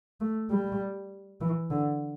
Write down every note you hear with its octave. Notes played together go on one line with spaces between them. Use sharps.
A3
G3
E3
D3